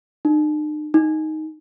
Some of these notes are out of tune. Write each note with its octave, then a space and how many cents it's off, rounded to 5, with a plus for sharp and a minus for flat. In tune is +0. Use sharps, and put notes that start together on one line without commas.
D#4 -45
D#4 +5